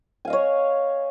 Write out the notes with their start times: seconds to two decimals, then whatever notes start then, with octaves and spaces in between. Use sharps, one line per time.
0.25 G#5
0.27 F5
0.30 D#5
0.33 C#5